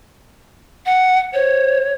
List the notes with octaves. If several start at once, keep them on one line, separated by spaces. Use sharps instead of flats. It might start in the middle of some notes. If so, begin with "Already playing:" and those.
F#5
C5 C#5